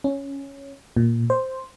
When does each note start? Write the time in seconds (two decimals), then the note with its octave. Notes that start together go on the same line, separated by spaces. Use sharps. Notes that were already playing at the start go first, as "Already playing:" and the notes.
0.04 C#4
0.96 A#2
1.30 C5